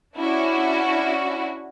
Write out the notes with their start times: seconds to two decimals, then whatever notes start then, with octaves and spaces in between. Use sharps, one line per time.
0.16 C#4 D4 E4 F#4